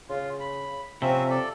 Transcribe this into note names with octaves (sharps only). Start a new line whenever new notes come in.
C#3 F4
B5
C3 F3 C4 C#4 E5
A4 D5